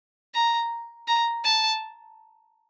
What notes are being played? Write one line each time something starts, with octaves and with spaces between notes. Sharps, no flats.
A#5
A#5
A5